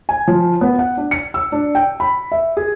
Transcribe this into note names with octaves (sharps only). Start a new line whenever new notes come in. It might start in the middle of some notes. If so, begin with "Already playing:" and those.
G#5
F3
B3
F#5
D4
C#7
E6
D4
G5
B5
E5
G#4